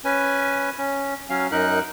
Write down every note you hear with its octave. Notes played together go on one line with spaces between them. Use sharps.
C#4 B4 G#5
C#4
F#3 C#4 F5
F#2 D#4 A#4 F#6